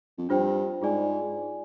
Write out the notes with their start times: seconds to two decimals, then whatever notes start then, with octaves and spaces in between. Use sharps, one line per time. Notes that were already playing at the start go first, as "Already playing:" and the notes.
0.18 F2
0.29 G2 D4 F4 C5 G5
0.82 G#2 F4 G#4 D5 G#5